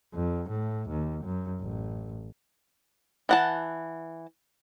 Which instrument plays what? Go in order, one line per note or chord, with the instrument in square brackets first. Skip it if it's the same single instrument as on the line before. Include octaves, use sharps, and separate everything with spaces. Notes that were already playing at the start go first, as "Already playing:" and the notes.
[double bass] F2
A2
D#2
F#2
A1
[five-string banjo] E3 F#5 A5